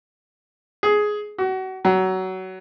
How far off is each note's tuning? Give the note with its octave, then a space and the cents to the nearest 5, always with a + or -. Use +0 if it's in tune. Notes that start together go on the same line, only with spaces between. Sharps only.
G#4 +10
F#4 +30
F#3 +20